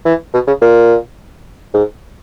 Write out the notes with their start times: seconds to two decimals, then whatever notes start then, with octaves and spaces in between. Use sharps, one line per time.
0.05 E3
0.34 B2
0.47 C#3
0.61 A#2
1.74 G#2